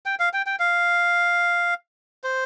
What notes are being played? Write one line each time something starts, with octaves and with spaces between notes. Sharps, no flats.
G5
F5
G5
G5
F5
C5